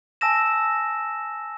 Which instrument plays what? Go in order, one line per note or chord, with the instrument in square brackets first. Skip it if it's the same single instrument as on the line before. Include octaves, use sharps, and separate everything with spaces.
[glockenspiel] G#5 A5 E6 A#6 E7